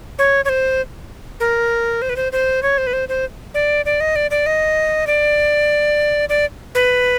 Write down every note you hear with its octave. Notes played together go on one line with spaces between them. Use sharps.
C#5
C#5
C5
A#4
C5
B4
C5
C5
C#5
C5
B4
C5
C5
D5
D5
D#5
D5
D5
D#5
D5
D5
B4